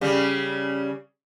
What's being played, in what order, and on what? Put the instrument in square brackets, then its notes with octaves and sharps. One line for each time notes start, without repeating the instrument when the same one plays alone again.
[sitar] C#3 G3